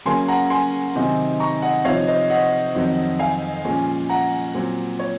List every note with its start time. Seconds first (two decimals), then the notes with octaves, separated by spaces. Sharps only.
0.05 C#3 F#3 A#3 C#4 G#5 C6
0.28 F#5 A#5
0.50 G#5 C6
0.95 C3 D#3 F#3 C4 D#4
1.40 A#5 C#6
1.62 D#5 F#5
1.84 C3 F3 C4 D#4 C#5 F5
2.07 C5 D#5
2.30 D#5 F#5
2.75 F2 D#3 F#3 C4
3.19 F5 G#5
3.64 A#2 F3 G#3 C#4
4.09 F#5 A#5
4.54 A#2 F#3 C4
4.99 C#5